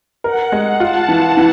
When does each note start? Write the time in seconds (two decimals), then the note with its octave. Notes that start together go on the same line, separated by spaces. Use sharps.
0.24 A#4 F#5
0.52 G#3
0.80 F4 A5
1.08 E3 A5
1.37 E3